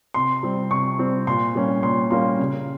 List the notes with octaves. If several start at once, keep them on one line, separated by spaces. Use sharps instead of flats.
C3 C6
G3 C4
C3 C#6
G3 C4
A#2 C6
G3 A#3 C#4
A#2 C6
G3 A#3 C#4 C6
C#3